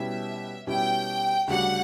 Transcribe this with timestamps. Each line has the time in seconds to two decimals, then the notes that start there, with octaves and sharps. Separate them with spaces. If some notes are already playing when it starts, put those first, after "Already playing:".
Already playing: B2 G3 C#4 E4 G4 E5
0.67 B2 G3 C#4 E4 G4 G5
1.47 D2 C#3 G3 D4 F#4 F#5